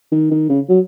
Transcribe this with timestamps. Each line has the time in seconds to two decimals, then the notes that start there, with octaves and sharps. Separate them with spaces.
0.12 D#3
0.31 D#3
0.49 C#3
0.69 F#3